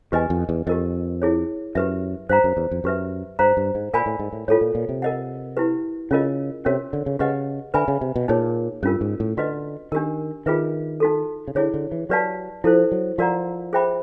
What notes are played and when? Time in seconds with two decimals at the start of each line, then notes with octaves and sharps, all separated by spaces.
0.12 E2 G4 B4 D#5 G#5
0.30 F2
0.49 E2
0.67 F2 G4 A#4 D#5
1.22 E4 G#4 C#5
1.75 F#2 G4 B4 E5
2.29 G2 C5 F5 A#5
2.44 F#2
2.57 E2
2.71 F2
2.84 F#2 G4 B4 E5
3.39 G2 C5 F5 A#5
3.57 G2
3.75 G#2
3.94 A#2 A#4 D5 F5 G#5 B5
4.06 A2
4.19 G#2
4.33 A2
4.48 A2 F4 A4 C#5
4.61 A#2
4.75 A#2
4.89 C3
5.02 A#4 D#5 F#5
5.57 E4 G4 B4
6.11 C#3 C#4 F4 A#4 D#5
6.65 C3 C#4 F#4 A#4 C#5
6.93 D3
7.06 C#3
7.19 C#3 G4 B4 D#5 F#5
7.74 D3 B4 E5 G#5 B5
7.88 C#3
8.01 C3
8.16 B2
8.28 A#2 D#4 G#4 C#5
8.83 G2 C#4 F4 A#4
9.01 G#2
9.20 A2
9.37 D3 F#4 B4 D#5
9.92 D#3 D4 G4 A#4
10.46 D#3 F4 G#4 B4 E5
11.00 D#4 F#4 A4
11.48 C#3
11.55 D3 E4 G#4 C#5
11.74 D3
11.92 E3
12.09 F#3 G4 B4 D5 F5 A5
12.64 F3 E4 A4 C5
12.92 F#3
13.18 F3 F#4 A#4 D5 F#5 A#5
13.73 G#4 C5 E5 G5 B5